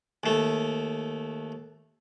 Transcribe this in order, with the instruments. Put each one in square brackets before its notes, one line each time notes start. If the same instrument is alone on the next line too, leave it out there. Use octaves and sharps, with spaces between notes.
[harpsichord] D#2 A3